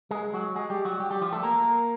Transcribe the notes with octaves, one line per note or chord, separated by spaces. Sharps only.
G#3 G#4
F#3 F#4
G#3 G#4
G3 G4
F#3 F#4
G3 G4
G3 G4
F3 F4
A3 A4
A#3 A#4